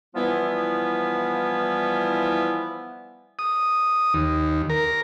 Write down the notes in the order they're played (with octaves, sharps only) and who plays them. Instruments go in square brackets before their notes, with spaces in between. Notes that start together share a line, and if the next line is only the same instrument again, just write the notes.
[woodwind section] E3 F3 G3 B3 E4
[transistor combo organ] D#6
D#2
A#4